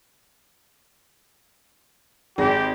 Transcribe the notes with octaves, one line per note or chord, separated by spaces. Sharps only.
G#1 G4 G#4 A#6